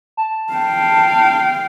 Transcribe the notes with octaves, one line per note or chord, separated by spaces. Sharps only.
A5
F5 G5